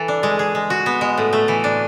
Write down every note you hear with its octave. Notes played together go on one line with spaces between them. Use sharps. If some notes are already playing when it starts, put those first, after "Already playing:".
Already playing: E3 A4
D4
G#3
G#4
G#3
F#4
B3
G#3
A2
A3
E3
D4